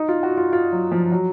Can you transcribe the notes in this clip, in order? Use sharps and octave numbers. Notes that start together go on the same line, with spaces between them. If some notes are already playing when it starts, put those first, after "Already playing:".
Already playing: D#4
F4
F#4
F4
F4
F#3
F3
F#3